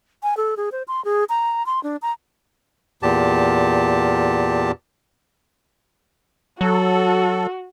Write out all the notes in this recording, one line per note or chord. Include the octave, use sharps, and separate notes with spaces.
G#5
A4
G#4
C5
C6
G#4
A#5
C6
D4
A#5
E2 A#2 G4 A5
F#3 F#4 A4